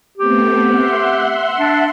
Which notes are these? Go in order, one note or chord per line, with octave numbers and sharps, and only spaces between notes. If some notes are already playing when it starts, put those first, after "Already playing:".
A3 B3 C4 G4
E5 F#5 C6
D4